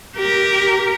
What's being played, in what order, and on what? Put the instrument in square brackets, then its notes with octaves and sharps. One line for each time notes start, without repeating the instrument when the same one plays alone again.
[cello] G4 A#4